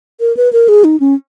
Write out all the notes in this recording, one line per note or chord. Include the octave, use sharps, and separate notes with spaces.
A#4
B4
A#4
G#4
D#4
C#4